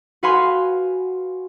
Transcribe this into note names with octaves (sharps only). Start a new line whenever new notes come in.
F#4 B4 F5 G#5 B5 C6